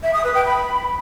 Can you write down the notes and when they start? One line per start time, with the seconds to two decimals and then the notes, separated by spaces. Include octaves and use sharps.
0.03 E5
0.13 D#6
0.24 B4
0.34 G5
0.45 B5